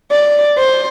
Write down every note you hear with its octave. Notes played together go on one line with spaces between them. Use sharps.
D5
C5